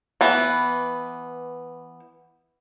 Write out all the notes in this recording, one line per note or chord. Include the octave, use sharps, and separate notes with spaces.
E3 B3